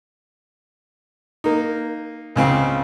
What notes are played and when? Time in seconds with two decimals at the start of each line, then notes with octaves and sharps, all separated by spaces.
1.44 A#3 D#4
2.36 C#2 C#3 C4 F5